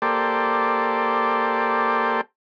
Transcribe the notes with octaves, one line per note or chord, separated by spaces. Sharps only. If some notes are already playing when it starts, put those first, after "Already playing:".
A#3 G4 A4 C5 D5